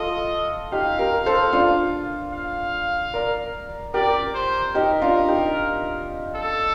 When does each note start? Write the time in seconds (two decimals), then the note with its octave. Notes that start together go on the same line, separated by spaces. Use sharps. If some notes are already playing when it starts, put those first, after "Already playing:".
Already playing: F4 A4 D#5
0.72 D#4 G4 F5
0.99 G4 A#4
1.26 A4 C5
1.53 D4 F4
2.33 F5
3.14 A#4 D5
3.94 G4 A#4 D5
4.34 C5
4.75 D#4 G4 A#4
5.02 D4 F4
5.28 D#4 G4
6.36 A4